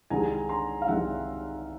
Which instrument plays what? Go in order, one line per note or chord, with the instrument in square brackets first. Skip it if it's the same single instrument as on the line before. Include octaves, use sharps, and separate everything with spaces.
[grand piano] C2 C3 D#3 G#3 [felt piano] G#5 A#5
[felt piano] A#5 C6
F5
[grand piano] C2 C3 D#3 G#3 [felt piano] E5 F#5